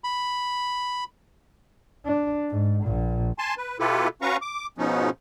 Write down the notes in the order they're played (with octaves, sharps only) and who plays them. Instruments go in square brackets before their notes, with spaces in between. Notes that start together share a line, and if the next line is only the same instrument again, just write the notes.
[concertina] B5
[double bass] D4
G#2
A#1 A#2
[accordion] G#5 A5 C6
B4
B2 E4 F4 G4 A4 B4
C#4 F#4 B4 F5 A#5 C#6
D6
G#2 B2 F3 B3 C#4 D#4